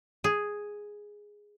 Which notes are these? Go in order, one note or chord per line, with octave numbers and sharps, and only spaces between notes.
G#4